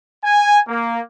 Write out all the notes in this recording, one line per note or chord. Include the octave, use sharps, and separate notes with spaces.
G#5
A#3